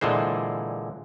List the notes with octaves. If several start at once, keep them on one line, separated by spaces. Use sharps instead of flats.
A#2 D3 E3 G#3 C5